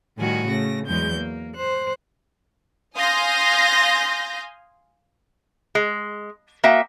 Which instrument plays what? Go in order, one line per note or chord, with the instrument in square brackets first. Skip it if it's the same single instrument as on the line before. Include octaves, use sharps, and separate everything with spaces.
[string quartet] A2 D#3 G3 F#4 G#5
C#3 A3 A#6
E2 F#3 G#3 G6
A#3
C5 F#6
[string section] F5 G#5 C6 D#6 G6 A#6
[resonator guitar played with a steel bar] G#3
A#3 F#4 D#5 E5 G5